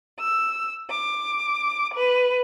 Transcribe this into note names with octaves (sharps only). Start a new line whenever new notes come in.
E6
D6
B4